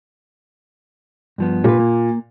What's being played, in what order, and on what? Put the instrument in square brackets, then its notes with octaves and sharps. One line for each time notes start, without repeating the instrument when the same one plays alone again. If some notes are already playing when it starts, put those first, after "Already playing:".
[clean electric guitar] G2 F3 B3
[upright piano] A#2 [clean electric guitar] B4 C#5
[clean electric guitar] A#3